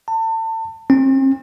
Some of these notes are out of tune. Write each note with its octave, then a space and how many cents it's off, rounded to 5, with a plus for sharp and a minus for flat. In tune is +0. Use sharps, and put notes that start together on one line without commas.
A5 +35
C4 +40